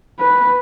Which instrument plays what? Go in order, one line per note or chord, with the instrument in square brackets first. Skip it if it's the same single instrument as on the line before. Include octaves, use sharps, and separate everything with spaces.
[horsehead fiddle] B4